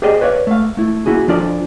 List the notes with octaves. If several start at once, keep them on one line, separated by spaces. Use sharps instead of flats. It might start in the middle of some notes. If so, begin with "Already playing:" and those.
G4 G#4 C5 D5 D#5 G5
B4 C#5 D5 F5
A3 F5
A3 E4
A#3 E4 F#4 G#4
F3 D4 F4 A4 D5